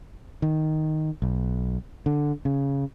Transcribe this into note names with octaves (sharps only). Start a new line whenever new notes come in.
D#3
B1
D3
C#3